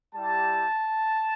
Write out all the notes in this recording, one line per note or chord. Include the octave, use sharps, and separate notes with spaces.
G3 E4 G4 A5